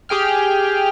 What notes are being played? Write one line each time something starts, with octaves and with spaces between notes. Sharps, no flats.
G4 G#4 G5 F6